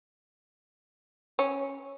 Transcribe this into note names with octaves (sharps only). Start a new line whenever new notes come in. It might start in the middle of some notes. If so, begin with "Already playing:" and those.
C#4